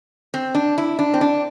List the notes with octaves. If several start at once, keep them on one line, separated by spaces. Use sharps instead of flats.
C4
D4
E4
D4
C4
D4